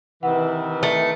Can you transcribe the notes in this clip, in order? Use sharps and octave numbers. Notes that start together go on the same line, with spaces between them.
C3 D#3 E3 F#5
A3